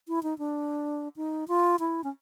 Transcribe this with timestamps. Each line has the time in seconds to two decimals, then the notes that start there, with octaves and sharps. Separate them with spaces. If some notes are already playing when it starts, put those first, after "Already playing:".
0.08 E4
0.23 D#4
0.39 D4
1.16 D#4
1.48 F4
1.79 E4
2.04 C#4